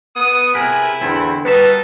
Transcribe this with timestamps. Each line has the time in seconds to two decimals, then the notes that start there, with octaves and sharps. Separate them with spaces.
0.16 B3 D#6
0.55 C3 E4 G#4 A#4 B4
1.01 E2 D3 C4
1.45 G3 B3 D#4 F#4 A#4 B4 E5 A5